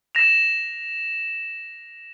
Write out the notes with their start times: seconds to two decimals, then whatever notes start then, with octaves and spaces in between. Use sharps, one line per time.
0.15 A#6 E7 F7